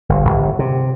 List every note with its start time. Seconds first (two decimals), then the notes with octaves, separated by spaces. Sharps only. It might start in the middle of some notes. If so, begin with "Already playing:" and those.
0.09 G1
0.25 G1
0.59 C3